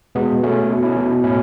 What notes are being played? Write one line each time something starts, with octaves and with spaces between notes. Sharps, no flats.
B2 G#3 B3
B2 A3 C#4
B2
C#4 E4
B2
A2 C#4 E4